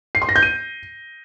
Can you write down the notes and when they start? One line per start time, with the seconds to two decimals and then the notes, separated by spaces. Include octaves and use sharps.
0.15 C7
0.22 C6
0.29 A#6
0.36 G6
0.43 D#7